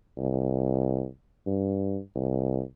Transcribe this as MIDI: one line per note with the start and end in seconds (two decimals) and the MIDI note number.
0.18 1.07 36
1.47 2.00 43
2.15 2.61 36